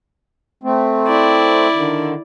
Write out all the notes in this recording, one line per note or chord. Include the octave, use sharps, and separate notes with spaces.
A3 C4
E4 D5
D3 D#3